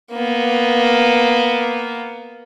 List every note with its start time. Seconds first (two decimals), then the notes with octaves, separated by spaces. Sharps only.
0.12 A#3 B3